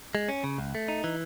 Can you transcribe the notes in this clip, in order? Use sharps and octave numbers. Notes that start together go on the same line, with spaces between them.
G#3
C#4
C#3
C#2
A3
D#4
E3